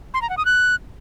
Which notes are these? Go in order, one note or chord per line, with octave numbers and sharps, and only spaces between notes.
C6
A#5
F#5
D#6
F#6